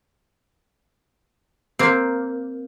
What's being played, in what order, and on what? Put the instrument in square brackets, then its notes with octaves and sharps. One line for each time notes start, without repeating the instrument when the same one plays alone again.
[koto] A#3 C4